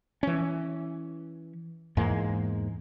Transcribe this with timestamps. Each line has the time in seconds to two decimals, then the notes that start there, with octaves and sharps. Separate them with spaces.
0.23 E3 C#4
1.97 E2 G#2 G#3 A#3